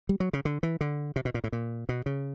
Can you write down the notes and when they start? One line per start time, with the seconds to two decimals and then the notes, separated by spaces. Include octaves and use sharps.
0.09 G3
0.20 F#3
0.33 C#3
0.45 D3
0.63 E3
0.81 D3
1.16 C3
1.25 B2
1.34 A#2
1.44 A2
1.52 A#2
1.89 B2
2.06 C#3